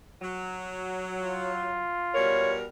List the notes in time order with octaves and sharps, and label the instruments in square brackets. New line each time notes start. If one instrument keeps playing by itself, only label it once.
[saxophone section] F#3
[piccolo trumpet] F4
[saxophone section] B2 G3 A#4 [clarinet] C#5